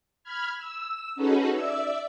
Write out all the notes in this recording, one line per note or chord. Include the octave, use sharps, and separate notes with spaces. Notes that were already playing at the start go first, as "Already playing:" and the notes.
B5 F6 G#6
E6
C#4 D#4 F#4 G#4 A4 B4
D5 E5 E6